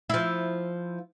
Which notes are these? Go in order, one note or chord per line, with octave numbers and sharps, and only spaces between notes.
F3 E4